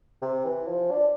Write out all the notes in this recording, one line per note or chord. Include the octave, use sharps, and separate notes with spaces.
C3
E3
F3
D4